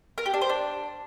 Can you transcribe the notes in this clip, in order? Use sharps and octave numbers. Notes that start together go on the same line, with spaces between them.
A#4
G4
D4
C5
D4